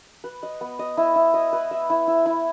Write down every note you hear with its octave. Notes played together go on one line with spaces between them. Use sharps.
B4
D#5
B3
D#5
E4
E4
D#5
B4
E5
E4
E4
E4